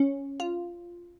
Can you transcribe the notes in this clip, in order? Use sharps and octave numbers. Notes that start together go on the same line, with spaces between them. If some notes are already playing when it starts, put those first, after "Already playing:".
Already playing: C#4
F4